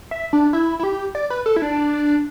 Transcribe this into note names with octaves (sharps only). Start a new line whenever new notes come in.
E5
D4
E4
E4
G4
D5
B4
A4
E4
D4